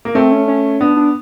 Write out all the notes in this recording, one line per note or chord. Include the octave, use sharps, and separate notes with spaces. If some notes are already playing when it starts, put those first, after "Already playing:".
A#3
A3 C4
C#4
C#4
B3 D4
D4